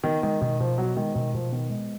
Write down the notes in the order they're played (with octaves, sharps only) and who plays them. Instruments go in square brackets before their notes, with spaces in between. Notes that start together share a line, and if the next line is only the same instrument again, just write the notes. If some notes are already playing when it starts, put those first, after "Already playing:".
[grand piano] D#3 [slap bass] B3
[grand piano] D#3 [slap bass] G#3
[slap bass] B2 [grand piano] D#3
[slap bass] B2 [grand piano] F3
[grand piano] F#3 [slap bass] B3
[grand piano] D#3 [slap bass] G#3
[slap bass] B2 [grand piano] D#3
[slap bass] B2 [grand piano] F3
[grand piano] D#3 [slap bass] B3
[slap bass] G#3